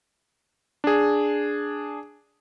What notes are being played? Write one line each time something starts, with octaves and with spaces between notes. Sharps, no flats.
D4 G#4